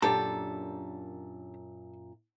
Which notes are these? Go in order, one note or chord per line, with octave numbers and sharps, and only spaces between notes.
F#2 A#2 D4 G4 A4 A#5